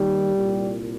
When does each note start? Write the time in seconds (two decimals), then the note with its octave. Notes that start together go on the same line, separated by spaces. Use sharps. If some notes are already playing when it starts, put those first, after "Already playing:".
Already playing: D#2 D#3 G3
0.34 C2 A#2